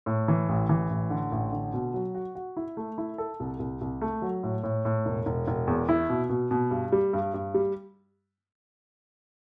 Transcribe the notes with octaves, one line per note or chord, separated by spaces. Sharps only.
A2
E3
A1
E3
A1
D3
A1
D3
B2
F#3
F#4
F#4
E4
A3
E4
A4
C2
C2
C2
A3
F#3
A2
A2
A2
E1
E1
E1
E2
E4
B2
B2
B2
G2
G3
G2
G2
G3